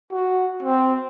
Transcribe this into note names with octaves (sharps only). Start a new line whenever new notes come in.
F#4
C4